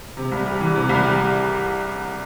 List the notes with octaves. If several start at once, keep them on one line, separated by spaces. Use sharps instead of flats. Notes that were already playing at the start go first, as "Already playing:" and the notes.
C3
C2
G3
E3
C3
C2
G3